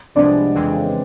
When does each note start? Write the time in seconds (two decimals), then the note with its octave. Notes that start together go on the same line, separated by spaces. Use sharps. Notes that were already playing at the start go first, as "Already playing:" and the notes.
0.15 C2 C3 F3 G#3 B3 D4 D5
0.55 F2 C#3 E3 G#3 C4